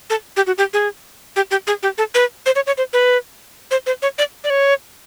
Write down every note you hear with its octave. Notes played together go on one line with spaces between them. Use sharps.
A4
G4
F#4
G4
G#4
G4
G4
G#4
G4
A4
B4
C5
C#5
C#5
C5
B4
C5
C5
C#5
D5
D5
C#5